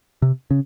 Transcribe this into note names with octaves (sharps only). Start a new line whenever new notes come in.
C3
C#3